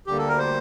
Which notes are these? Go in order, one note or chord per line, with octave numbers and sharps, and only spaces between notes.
D2 D3 G3 A#3 G4
A4
A#4
C5